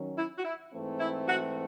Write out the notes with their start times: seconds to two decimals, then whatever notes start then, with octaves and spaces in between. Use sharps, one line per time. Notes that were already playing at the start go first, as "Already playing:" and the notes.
Already playing: D#3 F#3 C#4
0.17 E4
0.38 F#4
0.45 E4
0.73 G#2 E3 A3 C4
1.00 E4
1.28 F#4